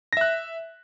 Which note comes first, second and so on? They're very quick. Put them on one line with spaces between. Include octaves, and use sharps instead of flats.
A#6 E5 F#6